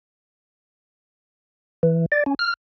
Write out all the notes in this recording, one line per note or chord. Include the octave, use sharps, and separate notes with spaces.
E3
D5
C#4
F6